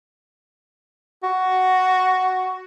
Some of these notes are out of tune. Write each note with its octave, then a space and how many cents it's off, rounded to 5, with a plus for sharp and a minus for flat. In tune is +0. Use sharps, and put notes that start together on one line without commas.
F#4 +5